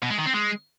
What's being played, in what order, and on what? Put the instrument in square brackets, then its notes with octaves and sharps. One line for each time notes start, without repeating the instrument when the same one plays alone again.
[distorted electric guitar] B2
G#3
D#3
C4
G#3